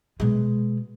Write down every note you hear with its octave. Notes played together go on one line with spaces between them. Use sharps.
B2 G#3